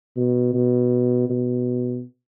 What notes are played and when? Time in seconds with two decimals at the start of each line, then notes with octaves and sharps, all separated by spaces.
0.17 B2
0.54 B2
1.30 B2